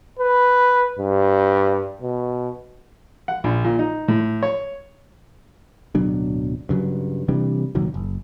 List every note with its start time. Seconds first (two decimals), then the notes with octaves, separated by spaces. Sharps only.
0.19 B4
0.99 G2
2.02 B2
3.28 F#5
3.44 A#1
3.64 A#2
3.79 D#4
4.08 A2
4.43 C#5
5.95 D1 B2 F#3 D4
6.69 G2 C#3 F#3
7.28 C3 E3 G3 D4
7.75 C2 A#2 D#3 F#3
7.94 F#1